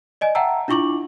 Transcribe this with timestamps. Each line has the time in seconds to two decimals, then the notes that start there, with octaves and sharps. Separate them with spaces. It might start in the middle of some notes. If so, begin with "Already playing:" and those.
0.21 D5 D#5 G#5
0.35 E5 F#5 G5 A5 A#5 E6
0.68 D4 E4 F4 C#6 D6 F#7